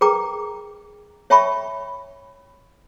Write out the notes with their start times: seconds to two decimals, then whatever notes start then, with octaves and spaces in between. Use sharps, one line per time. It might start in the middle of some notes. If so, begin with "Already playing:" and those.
0.01 G#4 A#4 B4 G5 A#5 D6
1.30 C#5 E5 G5 A5 B5 C#6